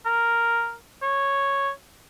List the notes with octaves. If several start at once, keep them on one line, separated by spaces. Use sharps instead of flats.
A#4
C#5